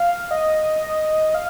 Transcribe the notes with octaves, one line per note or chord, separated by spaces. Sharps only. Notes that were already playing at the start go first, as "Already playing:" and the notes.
Already playing: F5
D#5
F5